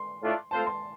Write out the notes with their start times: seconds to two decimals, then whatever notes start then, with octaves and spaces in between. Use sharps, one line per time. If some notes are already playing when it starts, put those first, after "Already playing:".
Already playing: C6
0.22 A2 A3 D4 F4 D5
0.51 A3 C4 F4 C5 A5
0.67 C6